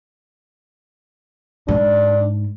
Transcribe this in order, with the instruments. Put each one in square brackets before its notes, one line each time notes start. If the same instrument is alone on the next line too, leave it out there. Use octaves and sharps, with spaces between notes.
[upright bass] G#2 [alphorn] D4